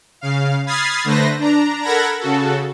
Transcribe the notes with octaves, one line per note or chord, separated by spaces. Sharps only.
C#3 F5
B5 D#6 F6 G#6 A6 C7
D3 A3 B4 C5 A#6
D4 A#5
A4 A#4 F#5 B5 G#6 A#6
C#3 F#4 A4